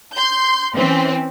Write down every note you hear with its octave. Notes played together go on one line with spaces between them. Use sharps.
C6 G6
E3 C4 C#4